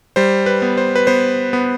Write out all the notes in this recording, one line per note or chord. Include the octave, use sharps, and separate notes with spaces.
G3 C5
B4
B3
C5
B4
B3 C5
B3